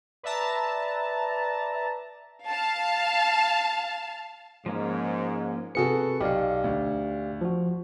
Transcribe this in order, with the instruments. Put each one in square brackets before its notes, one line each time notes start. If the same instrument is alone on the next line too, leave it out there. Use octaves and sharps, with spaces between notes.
[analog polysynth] B4 D5 E5 A5 A#5
[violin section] F5 A5
[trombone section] G#2 [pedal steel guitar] F3 A#3 C#4
[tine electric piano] C3 G#4 C#7 [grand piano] B3 F#4 A4
[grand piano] B1 [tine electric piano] G4 D5 F5
[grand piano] D2
[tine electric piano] F3 F#4